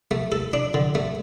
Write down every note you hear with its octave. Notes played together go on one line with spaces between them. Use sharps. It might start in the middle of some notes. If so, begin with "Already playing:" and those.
A3
A4
D4
D3
A3